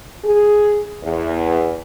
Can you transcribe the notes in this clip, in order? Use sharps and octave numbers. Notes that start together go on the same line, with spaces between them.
G#4
E2